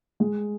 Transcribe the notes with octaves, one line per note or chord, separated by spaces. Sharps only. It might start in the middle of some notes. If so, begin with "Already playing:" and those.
G#3